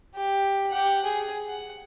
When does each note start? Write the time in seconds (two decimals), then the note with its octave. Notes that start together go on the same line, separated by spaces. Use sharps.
0.15 G4
0.71 G4 F#5
1.04 G#4
1.49 F#5